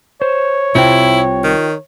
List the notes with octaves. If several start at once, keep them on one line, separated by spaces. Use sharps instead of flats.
C5 C#5
C2 C3 C4 E4 F4 G5
D#3